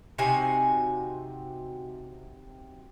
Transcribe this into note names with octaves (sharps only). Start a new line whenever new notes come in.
C3 D#4 F#4 G#5